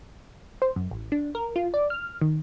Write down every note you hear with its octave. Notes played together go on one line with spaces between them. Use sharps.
C5
F#2
A1
D4
A#4
F4
D5
F6
D#3